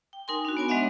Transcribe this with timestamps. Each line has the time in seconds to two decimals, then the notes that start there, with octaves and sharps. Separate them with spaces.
0.13 G5
0.28 D#4 A#4 G#5 C6
0.45 D4 F#4
0.57 B3 C#5 G#5
0.68 G#3 D4 C#5 D#5 E5 F#5